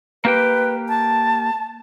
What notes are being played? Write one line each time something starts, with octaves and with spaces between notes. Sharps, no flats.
A#3 G4 B4 G5
A5